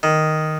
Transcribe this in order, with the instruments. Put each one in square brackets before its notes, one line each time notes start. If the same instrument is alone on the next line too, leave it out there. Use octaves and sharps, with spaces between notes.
[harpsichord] D#3